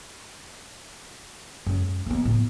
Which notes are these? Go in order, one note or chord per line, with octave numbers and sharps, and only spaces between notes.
F#2 G#3
D#2 B3
A2